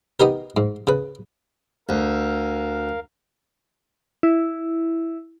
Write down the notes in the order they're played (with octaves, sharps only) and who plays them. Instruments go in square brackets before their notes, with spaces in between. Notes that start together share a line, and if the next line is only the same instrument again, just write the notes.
[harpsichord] B3 D#4 G4 A#4
G#2
C#3 B4
[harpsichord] D2 [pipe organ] A#4 F5
[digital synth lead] E4